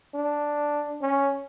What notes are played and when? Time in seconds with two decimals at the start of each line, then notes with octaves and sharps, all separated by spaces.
0.14 D4
1.01 C#4